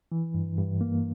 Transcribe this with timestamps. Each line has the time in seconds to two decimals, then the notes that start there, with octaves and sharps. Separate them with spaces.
0.12 E3
0.34 G2
0.58 G2
0.81 A#3